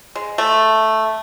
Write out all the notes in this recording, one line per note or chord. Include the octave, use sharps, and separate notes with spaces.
G#3
A3